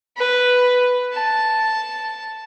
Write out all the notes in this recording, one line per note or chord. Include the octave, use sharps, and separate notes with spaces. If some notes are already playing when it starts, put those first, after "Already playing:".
B4
A5